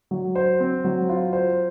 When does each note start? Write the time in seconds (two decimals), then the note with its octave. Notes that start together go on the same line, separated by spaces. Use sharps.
0.11 F#3
0.35 C5
0.60 C4
0.84 F#3
1.09 F4
1.33 C5